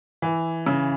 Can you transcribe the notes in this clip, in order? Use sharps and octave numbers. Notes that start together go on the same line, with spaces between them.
E3
C#3